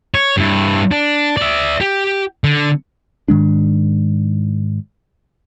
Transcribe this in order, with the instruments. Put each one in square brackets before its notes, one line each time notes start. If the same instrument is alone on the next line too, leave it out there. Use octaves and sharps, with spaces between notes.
[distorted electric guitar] C#5
G2 E4
D4
D5 E5
G4
D3
[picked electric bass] G#2 D#3 G#3 D4